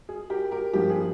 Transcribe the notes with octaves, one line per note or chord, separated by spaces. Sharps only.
G#4
G4 A#4
G4 A#4
G2 F3 A#3 G4
G#4